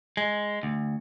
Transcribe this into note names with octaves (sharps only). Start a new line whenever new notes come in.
G#3
D2